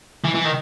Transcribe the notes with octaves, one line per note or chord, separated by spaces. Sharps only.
E3
E3
D#3